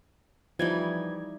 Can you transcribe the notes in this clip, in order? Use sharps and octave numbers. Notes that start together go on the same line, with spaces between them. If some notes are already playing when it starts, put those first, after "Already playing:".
E3 F3 G3 D#4 G#6